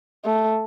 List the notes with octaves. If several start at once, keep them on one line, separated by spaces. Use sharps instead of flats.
A3